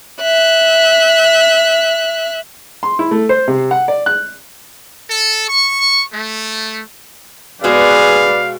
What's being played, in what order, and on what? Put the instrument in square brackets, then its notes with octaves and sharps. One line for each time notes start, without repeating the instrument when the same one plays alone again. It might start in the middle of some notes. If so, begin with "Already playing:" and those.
[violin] E5 F#6
[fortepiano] C6
E4
A3
C5
C3
F#5
D5
F#6
[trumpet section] A4
C#6
A3
[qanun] B2 G#3 F#4 [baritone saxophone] G#4 [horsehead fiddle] B4 D5 [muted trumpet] F5